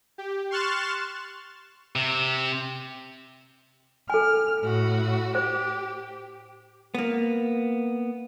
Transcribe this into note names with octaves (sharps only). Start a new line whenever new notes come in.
G4
C6 C#6 F6 F#6 A6 E7
C3
A4 G#5 F6
A2 F#4
G4 C5
A#3 B3